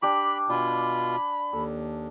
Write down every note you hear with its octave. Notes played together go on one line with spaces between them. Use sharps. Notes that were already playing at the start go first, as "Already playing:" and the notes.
D4 G4 B5 D6
B2 D4 F4 G#5 B5
D#2 A4